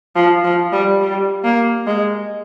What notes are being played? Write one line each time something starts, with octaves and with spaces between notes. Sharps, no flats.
F3
F3
G3
G3
A#3
G#3